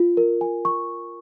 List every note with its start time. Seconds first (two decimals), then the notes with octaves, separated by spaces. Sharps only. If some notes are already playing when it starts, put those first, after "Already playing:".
Already playing: F4
0.17 A#4
0.41 G#5
0.65 C#6